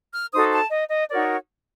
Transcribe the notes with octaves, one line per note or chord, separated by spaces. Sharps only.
F6
D#4 F#4 A4 C5 D#6
A5
D#5
D#5
D#4 F#4 A#4 C#5 D5